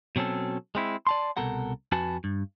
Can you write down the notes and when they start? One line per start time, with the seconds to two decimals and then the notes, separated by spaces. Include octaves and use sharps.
0.16 B2 F#3 C4 C#4 A4
0.75 G#3 C4 E4
1.07 D5 A5 C6
1.37 C2 B2 A4 A#4 F#5
1.92 F2 F#4 B4 G#5 A5
2.24 G2